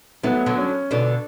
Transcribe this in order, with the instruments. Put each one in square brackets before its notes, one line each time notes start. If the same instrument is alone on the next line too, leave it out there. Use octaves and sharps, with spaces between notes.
[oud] F#3 A3 [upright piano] B3
[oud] D3 F#3
[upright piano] C#4
[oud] B2 D3 [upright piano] D4